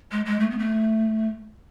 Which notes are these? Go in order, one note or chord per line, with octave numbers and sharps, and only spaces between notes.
G#3
G#3
A3
B3
A3